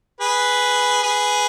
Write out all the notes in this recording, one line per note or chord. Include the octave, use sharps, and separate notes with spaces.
G#4 B4
G#4 B4